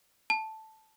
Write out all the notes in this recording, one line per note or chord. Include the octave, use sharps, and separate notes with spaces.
A5